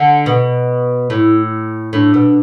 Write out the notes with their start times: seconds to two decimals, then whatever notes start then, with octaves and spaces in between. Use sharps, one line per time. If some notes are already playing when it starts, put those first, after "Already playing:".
Already playing: D3
0.26 B2
1.10 A2 E4
1.93 A2 D4
2.14 B2